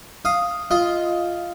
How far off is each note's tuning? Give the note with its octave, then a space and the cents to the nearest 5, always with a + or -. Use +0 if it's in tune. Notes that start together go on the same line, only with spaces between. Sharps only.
F5 +0 D#6 +0
F4 -5 D#5 +10